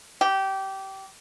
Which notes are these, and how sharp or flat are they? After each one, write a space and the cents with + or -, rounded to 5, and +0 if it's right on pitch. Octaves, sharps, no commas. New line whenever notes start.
G4 -20